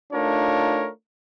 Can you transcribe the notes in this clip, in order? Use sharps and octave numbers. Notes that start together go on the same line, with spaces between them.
A3 D4 D#4 F4 A#4 C#5